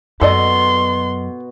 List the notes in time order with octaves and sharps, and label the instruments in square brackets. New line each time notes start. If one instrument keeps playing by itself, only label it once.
[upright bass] F#2 [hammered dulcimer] B2 [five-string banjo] A4 D5 D#5 [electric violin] C6